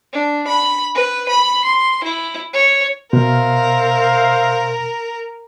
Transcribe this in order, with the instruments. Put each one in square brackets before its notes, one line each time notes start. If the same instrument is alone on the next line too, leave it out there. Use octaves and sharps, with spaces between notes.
[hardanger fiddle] D4
B5
B4
B5
C6
E4
C#5
[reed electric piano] B2 [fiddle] A#4 [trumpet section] C5 E5 F5